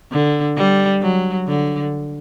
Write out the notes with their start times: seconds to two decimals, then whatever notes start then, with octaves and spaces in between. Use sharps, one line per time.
0.11 D3
0.57 G3
1.02 F#3
1.47 D3